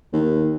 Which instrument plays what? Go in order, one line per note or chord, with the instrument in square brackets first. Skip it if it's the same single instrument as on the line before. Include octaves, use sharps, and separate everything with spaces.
[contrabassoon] D#2